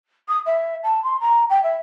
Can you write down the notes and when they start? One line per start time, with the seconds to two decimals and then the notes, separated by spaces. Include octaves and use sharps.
0.28 D#6
0.45 E5
0.83 A5
1.03 C6
1.20 A#5
1.49 G5
1.63 E5